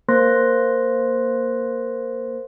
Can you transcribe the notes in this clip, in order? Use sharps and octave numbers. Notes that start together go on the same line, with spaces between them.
A#3 A#4 C5 C6 F#6 A#6